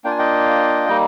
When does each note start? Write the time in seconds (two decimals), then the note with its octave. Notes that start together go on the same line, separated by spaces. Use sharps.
0.04 A#3 D4 F4 G5
0.11 G#5
0.19 D#5 G5
0.89 G3 A#3 D#4